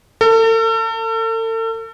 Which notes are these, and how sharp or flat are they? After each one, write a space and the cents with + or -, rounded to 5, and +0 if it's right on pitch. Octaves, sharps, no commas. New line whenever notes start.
A4 +40